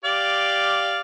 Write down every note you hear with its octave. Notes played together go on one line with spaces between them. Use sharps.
G4 D5 F5